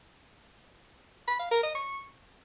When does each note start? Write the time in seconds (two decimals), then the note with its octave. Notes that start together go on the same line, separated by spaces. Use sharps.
1.28 B5
1.39 F5
1.51 A#4
1.63 D#5
1.75 C#6